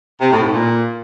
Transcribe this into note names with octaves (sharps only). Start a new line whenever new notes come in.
C3
A2
G#2
A#2